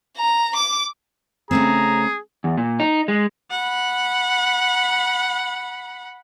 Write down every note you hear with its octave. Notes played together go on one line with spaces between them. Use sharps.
A#5
D6
C#3 A3 C4 G#4 A#5
E2
A#2
D#4
G#3
F#5 B5